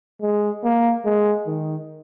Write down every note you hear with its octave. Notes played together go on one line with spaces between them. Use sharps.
G#3
A#3
G#3
D#3